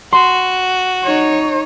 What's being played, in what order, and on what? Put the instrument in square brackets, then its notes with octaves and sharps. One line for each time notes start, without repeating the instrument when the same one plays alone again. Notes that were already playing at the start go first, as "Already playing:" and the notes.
[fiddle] F#4 [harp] C6
[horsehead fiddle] D#4 C#5